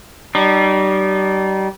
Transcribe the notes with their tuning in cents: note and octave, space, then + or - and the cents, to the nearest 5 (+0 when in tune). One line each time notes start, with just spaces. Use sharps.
G3 -30 D#4 -45